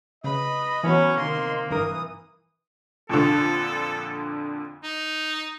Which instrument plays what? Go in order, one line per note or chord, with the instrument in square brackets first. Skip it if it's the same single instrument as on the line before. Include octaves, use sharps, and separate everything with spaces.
[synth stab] C#3 [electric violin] B4 B5 [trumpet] D#5
[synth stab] E3 B3 [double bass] F#3 [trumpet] C#4
[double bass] C3 D#3 [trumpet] A#3 [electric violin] C6
[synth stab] G#1 G2 A#4 [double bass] E3 [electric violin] D#6
[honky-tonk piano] F2 A#2 D3 [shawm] A4
[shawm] D#4